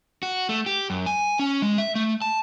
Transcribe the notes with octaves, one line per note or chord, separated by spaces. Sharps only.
F#4
A3
G4
F#2
G#5
C#4
G#3
E5
A3
A5